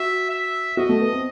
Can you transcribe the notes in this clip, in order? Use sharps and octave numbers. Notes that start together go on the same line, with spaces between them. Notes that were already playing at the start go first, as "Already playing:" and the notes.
Already playing: F#4 E5
E5
F#4 D#5
A3
B3
C4